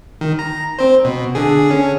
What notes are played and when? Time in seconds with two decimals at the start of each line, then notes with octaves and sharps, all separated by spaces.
0.21 D#3
0.39 A#5
0.79 C4 C5
1.05 B2
1.35 D3 G#4
1.71 C#4